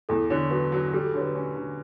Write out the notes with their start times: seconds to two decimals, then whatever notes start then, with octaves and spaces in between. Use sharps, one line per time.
0.09 E2 A4
0.30 D3 C#5
0.51 F#3 B4
0.72 F#3
0.93 G3 A4
1.06 A4
1.14 D3 C#5
1.21 B4
1.35 C#4
1.56 D3